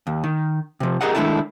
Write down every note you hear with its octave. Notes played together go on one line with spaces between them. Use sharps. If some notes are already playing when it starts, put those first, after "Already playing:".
D#2
D#3
C3 F3
G4 G#4 A#4 D#5 F#5
D#3 G#3 A3 D4 E4 A4